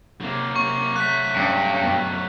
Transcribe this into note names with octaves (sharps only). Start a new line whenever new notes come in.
C3 F#3 A#3
C3 C#6
F#3 A3 F#6 B6
G2 C#4
F#2 B2